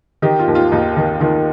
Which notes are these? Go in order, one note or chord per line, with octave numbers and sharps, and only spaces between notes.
D#3 D#4 G4
F4
D#2
F4
D#2 D#4
D#3
D#3 F4